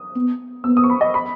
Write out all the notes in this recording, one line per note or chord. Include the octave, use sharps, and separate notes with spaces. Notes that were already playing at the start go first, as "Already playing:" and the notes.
Already playing: D#6
B3
B3 E6
D#6
C#6
B5
D#5
B5